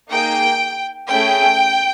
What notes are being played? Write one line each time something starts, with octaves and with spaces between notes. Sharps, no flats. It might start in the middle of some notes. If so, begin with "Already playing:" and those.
A#3 D#4 G#4 G5
A3 C#4 E4 G#4 G5